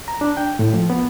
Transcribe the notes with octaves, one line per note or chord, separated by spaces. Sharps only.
A#5
D4
G5
A2
F3
B3